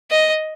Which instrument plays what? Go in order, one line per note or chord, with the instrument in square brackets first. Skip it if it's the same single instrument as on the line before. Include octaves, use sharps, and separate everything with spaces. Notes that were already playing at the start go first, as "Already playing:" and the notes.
[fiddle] D#5